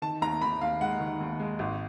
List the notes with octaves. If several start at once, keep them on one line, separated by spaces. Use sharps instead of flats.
D#3 A5
D#2 A#5
D#2 B5
D#2 F5
G#3 F#5
D#3
D#2
G#3
G#1